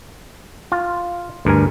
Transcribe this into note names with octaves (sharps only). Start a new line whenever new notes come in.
F4
D2 G2 A#4 G#5